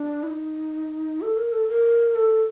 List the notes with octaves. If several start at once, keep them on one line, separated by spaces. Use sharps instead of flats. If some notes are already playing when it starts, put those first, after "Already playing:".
Already playing: D4
E4
D#4
A4
A#4
A4
A#4
A4